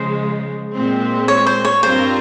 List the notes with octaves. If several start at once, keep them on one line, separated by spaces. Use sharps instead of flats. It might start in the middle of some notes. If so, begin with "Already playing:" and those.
Already playing: C#3 F3 G#3 C5
A#2 G#3 C4
C#5
C5
C#5
G2 G3 C4 F4 A#4 C5